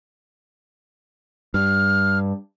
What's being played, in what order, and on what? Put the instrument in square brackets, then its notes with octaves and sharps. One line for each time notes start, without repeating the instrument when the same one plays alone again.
[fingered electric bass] G2 [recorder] F6